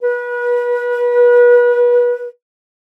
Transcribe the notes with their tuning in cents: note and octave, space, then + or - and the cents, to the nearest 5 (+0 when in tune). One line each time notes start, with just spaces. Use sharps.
B4 -30